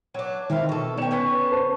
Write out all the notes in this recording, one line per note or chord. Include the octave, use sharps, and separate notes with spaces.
F#3 D4
D#3 C4 E4 F4
B2 A4
B3 C#4 C#5 G5 E7
D3 C#4 B4
C5 A5